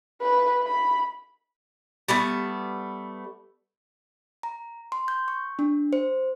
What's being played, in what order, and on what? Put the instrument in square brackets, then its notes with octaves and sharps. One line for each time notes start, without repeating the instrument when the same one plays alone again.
[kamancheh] B4
B5
[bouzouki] G3 A3 B3
[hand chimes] A#5
C6
G6
C#6
D4
C5